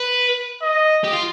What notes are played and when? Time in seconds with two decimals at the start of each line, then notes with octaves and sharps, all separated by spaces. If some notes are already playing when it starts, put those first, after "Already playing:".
Already playing: B4
0.62 D#5
1.05 G4
1.13 F4